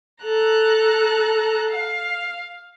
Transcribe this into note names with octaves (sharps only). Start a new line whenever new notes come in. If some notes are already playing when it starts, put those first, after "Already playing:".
A4 A#5 F#6
F5